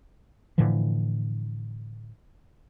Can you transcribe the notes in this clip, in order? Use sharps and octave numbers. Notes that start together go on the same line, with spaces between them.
A2 D3 E3 F3